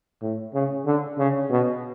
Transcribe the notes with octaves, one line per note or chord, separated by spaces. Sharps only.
A2
C#3
D3
C#3
B2